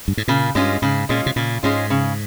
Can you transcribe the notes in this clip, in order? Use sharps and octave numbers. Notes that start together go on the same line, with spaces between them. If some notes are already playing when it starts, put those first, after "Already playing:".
G2
G#2
A#2 C#3
G2 G#3 C#4 F4
G#2 C#3
A#2 G#3 C#4 F4
C3
A#2 C#3
G#2 G#3 C#4 F4
C#3